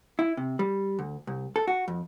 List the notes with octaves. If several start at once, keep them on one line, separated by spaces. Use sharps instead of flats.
E4
C3
G3
D2
C2
A4
F#4
F2